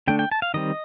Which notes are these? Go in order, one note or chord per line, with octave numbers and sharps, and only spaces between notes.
D3 A3 D4 G5
G5
A5
F5
D#3 G3 C4 D#5